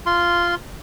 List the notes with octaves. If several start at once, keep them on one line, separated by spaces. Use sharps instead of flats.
F4 C6